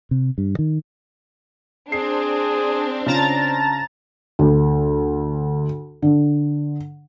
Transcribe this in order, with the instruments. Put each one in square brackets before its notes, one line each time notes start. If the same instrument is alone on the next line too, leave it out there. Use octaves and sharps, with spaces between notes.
[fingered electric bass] C3
G2
D#3
[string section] C4 D4 [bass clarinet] G#4 [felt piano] C7
[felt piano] C#3 F4 [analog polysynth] A5 A#5 A6
[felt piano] D2
D3